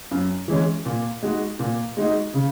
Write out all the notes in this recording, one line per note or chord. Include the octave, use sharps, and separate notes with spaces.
F#2
E3 G#3 C#4
A#2
G#3 D#4 F#4
A#2
G#3 D#4 F#4
C#3